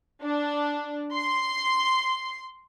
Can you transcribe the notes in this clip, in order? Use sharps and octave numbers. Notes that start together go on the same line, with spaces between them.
D4
C6